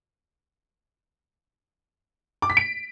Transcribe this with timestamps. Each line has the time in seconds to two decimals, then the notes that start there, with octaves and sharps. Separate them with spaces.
2.42 D6
2.50 B6
2.57 D7